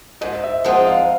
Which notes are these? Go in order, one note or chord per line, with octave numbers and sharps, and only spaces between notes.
G#2 D#5
E5
F3 G#3 C4 D#4 F#5
F5